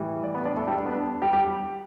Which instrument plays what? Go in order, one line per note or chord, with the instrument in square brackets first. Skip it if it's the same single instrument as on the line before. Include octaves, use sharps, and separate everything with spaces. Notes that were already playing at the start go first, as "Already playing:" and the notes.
Already playing: [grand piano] A2 E3 G3
D5
B3 B4
D4 D5
A3 A4
G3 G4
D4
B3
D4
G3 G4
G3 G4